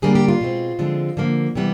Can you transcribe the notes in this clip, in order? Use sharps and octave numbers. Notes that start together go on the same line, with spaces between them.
D3 G3 A#3 D4 G#4
G4
F4
B2 G#3 C4
D3 F3 G#3 C4
D3 F3 A#3
C3 E3 G3 B3